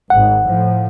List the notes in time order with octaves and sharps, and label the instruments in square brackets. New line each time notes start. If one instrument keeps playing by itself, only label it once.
[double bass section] G#1 G#2 [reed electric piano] F#5
[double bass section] A2 F3